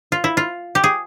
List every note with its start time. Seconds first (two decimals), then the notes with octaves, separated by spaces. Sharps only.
0.12 F4
0.24 E4
0.37 F4
0.75 G4
0.84 G#4